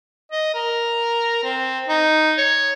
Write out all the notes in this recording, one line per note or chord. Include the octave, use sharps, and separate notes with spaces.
D#5
A#4
C4
D#4
C#5